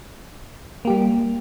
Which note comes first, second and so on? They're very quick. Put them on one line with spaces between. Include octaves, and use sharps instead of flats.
A#3 G4 G3